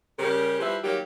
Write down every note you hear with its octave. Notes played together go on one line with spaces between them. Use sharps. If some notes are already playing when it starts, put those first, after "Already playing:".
C#3 G3 G4 A#4
F3 G3 E4 B4 C5
D#3 F#3 A#3 G4